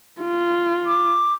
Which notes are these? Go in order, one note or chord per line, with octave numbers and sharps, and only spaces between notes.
F4
D6